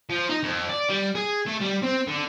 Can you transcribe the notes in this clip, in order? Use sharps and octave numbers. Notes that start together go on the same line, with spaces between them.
F3
D#4
F2
D5
G3
G#4
A3
G3
C4
D3